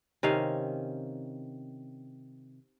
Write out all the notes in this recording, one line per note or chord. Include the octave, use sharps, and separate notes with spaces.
C3 D#3 C#4 F5